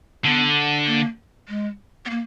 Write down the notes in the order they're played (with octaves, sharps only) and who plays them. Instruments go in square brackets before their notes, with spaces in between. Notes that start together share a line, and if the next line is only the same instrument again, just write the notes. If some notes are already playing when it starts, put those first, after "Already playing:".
[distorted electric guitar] D3 [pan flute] B3
[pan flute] A#3
G#3
B3
A#3